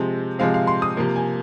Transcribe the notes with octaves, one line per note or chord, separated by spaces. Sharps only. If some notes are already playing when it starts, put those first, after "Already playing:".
Already playing: C3 F3 G#3 C4
C3 F3 G#3 C4 F5
F5
C6
D#6
C3 F3 A#3
G#5